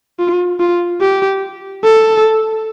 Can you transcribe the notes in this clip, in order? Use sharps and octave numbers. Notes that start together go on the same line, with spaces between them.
F4
F4
G4
A4